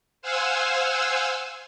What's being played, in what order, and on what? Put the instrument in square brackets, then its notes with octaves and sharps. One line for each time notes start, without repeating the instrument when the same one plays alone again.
[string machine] C5 F5 F#5 G#5 E6